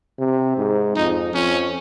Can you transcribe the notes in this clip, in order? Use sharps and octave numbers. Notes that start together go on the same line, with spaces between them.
C3
G#2
F2 D#4
F2 C#4